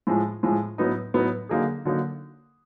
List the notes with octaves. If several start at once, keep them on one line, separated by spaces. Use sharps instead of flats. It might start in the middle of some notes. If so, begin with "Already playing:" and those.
A2 F3 G#3
A2 F3 G#3
A2 F#3 B3 D#4
A2 F#3 B3 D#4
D3 F#3 A#3 D#4 G#4
D3 F#3 A#3 D#4